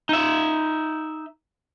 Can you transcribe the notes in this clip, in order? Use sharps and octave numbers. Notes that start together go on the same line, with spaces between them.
D#4 E5